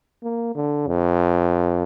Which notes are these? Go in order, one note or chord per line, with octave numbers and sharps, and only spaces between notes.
A#3
D3
F2